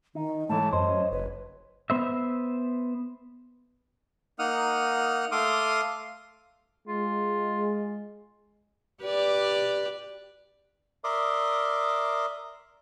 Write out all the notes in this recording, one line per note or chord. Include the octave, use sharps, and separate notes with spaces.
D#3 D#4
G#2 E3 A3 C#5 A5
F#2 C5 D#5
F#1 B4
B3 C5 E5
A#3 D#4 F#5 D#6 F6
A3 F5 C6 D6 D#6
G#3 F4
G4 B4 D5
A#4 D5 E5 C6 D6 D#6